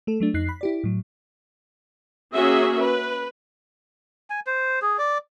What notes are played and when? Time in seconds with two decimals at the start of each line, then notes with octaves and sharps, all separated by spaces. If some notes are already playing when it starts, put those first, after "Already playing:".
0.07 A3 A4
0.20 F#3 A3 D4
0.34 F2 D#4 F#6 C7
0.49 B5
0.61 E4 G4 D5
0.84 A2 F#3
2.34 A#3 C#4 F#4 G#4 E5
2.80 B4
4.30 G#5
4.47 C5
4.82 G#4
4.98 D5